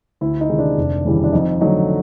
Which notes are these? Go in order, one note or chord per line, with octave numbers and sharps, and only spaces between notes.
D2 E4
D#4
C3 D#3 G#3
D4
F1
D#2 C#3 E3 G3
D4
F2 D#4
D3 F#3 A3 D#4